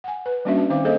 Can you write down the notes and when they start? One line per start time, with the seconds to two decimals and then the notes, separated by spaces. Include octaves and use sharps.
0.04 F#5 G#5
0.26 B4
0.45 G3 A#3 C#4 D4 F#4 E5
0.57 A5
0.70 D#3 C4 D#4 C5 F5 D6
0.84 A#3 G#4 A4 C5 D#5